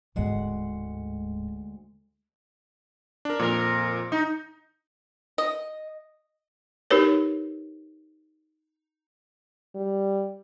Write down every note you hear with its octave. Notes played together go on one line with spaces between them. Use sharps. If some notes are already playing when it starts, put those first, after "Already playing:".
D1 D2 G#2 G#3 F#5
D4 A#4
F2 A#2 A#4
D#4
D#5
D#4 G4 A#4 B4 C#5
G3